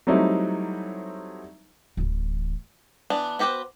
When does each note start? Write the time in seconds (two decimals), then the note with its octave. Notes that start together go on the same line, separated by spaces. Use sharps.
0.07 F#3 G3 A3 C4 D#4 E4
1.97 D1 E3
3.10 E3 B3 D4
3.39 B3 F#4 G4 B4 C5